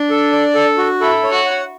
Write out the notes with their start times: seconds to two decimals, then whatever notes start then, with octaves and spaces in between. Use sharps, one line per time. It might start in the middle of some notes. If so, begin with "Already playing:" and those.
Already playing: D4
0.10 A4
0.32 D5
0.55 A4
0.78 F#4
1.01 E4 A4
1.24 C#5
1.31 F#4
1.46 F#5